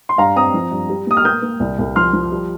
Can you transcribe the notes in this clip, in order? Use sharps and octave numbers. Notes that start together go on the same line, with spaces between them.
C6
G2 F5 A#5
C4 A#5 D#6
F3
G2
G3
A#2 D#6
F6
A#3 D#6 G6
A#3
C2
C2
F3 C6 F6
F3
G3